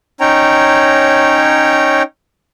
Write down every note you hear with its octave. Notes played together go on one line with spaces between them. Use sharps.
C#4 D#4 C#5 G5 A#5